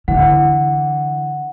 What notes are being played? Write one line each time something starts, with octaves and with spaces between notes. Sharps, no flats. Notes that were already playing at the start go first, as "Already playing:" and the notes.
D3 E3 F#5